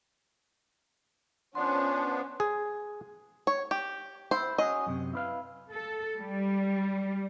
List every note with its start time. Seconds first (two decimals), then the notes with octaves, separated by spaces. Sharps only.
1.55 F3 B3 C#4 D4 C6
2.40 G#4
3.47 C#5
3.71 G4
4.31 E4 C5
4.58 C#4 F#4 G#4 D#5
4.87 F#2 C3
5.13 E4 B4 F5
5.71 A4
6.17 G3